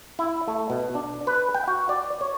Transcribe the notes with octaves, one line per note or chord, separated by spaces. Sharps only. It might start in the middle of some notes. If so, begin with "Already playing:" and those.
E4
A3
B2
D4
B4
G5
F#4
D5
C#5